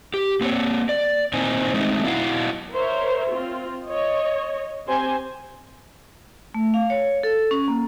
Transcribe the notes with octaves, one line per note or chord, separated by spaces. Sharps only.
G4
A#3 C4 C#5
D5
A#2 D#3 C4 D#4 C5 G#5
G#3 A3 C4 D#4
F#3 B3 E4 F5 F#5
A#4 C5 C#5 E5
C4 F4
C#5 D#5
C4 G4 C5 G#5
A3
F5
C#5
A4
C#4
A#3